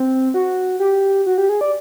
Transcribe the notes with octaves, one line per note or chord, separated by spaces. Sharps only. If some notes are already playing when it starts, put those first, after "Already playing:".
Already playing: C4
F#4
G4
F#4
G4
G#4
D5